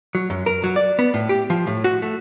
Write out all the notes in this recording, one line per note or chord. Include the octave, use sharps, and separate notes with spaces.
F#3
F#2
A#4
F#3
D5
B3
A2
G4
F3
A2
F#4
A3